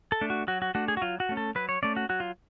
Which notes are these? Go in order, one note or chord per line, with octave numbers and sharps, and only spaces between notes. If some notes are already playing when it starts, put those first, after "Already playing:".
A4
A3 D4
F#4
F#3 F#4
F#4
A3 D4 F#4
G#4
F#4
F#3 F4
F#4
A3 C#4
A4
F#3 B4
C#5
A3 C#4 D5
F#4
F#3 F#4
F4